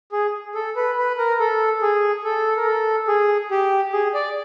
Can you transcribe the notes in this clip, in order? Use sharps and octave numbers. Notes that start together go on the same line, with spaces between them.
G#4
A4
B4
B4
A#4
A4
G#4
A4
A#4
A4
G#4
G4
G#4
D5